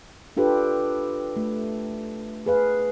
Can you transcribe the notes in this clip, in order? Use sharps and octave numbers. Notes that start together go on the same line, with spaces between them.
D4 F4 G4 A4 B4
A3
G#4 B4 F5